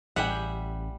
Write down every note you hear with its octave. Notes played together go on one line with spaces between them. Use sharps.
A1 G3 G#4 E5 F#5 G5